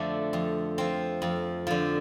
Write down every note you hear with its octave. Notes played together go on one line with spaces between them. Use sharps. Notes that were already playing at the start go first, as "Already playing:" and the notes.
Already playing: F2 D3 F3 A3 D4
F2
F3 C4
F2
D3 F3